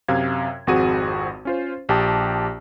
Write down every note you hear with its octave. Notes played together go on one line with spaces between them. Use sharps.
F#2 C3 F5 G#6
G#1 F2 C4 F#4 G#4 D#7
C#4 F4 C5
A#1 G4 A5 D#6